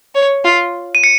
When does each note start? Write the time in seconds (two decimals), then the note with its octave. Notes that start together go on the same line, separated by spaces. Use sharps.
0.15 C#5
0.44 F4
0.95 D#7
1.04 C#7